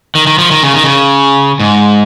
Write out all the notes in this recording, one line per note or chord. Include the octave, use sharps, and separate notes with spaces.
D#3
D#3
F3
D#3
C#3
D#3
C#3
G#2